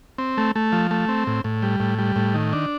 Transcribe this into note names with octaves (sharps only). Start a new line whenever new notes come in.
C4
A3
A3
F3
A3
C4
A2
A2
G3
A2
G3
A2
D#3
D4